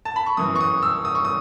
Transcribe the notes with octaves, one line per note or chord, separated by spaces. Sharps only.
A5
B5
C#6
F#2 E3 D#6
C#6
D#6
E6
D#6
C#6
D#6